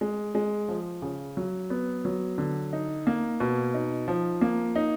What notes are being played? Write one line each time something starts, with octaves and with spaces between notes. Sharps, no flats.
G#3
G#3
F3
C#3
F#3
B3
F#3
D3
D#4
A#3
B2
D#4
F3
A#3
D#4